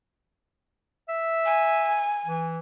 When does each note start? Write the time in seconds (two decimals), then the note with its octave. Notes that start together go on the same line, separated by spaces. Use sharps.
1.09 E5
1.46 G#5
2.25 E3